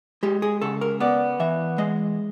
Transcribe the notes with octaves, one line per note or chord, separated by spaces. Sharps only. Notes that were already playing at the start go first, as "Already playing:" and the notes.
G#3 G4
G#4
C#3 A4
A#4
B3 D5
E3 E5
G#3 D#5